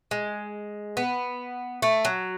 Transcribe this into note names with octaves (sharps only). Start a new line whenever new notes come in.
G#3
B3
A3
F#3